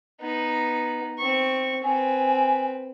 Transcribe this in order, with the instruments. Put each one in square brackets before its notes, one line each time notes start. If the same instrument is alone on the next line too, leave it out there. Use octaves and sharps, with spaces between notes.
[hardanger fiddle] B3 D#4
C4 C#6
[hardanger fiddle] C4 B4 [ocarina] G#5